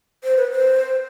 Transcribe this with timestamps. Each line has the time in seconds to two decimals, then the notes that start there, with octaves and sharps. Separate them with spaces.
0.24 C5
0.37 B4
0.51 C5